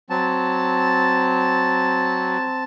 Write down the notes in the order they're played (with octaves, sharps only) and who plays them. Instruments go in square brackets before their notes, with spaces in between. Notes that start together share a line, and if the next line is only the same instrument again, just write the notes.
[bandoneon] F#3 [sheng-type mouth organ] C4 A5